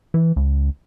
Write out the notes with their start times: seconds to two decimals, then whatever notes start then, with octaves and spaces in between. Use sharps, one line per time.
0.14 E3
0.36 C#2